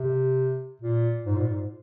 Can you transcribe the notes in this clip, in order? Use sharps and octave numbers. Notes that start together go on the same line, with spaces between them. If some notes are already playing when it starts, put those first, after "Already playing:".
Already playing: C3
A#2
G#2
A#2
G#2